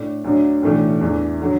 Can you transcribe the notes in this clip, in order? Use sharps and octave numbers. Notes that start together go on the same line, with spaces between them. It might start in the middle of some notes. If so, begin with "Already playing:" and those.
Already playing: A2 D4
D2 D3 F#3 D4
B1 A2 E3 A3 D4
E2 E3 D4
D3 F#3